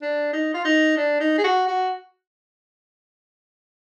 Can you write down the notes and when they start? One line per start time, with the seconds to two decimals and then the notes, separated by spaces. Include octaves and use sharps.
0.02 D4
0.33 D#4
0.54 F4
0.65 D#4
0.97 D4
1.20 D#4
1.38 G#4
1.44 F#4
1.68 F#4